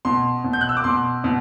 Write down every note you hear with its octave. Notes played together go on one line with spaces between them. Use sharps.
B2 C6
B2
G6
F#6
E6
D6
B2 C6
B2